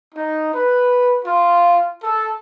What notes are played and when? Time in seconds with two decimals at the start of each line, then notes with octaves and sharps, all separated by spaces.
0.14 D#4
0.53 B4
1.25 F4
2.03 A4